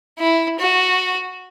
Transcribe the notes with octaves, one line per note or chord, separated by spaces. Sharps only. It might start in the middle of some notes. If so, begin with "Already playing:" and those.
E4
F#4